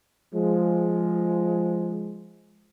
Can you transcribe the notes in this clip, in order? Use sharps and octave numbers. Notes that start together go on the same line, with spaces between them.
F3 G#3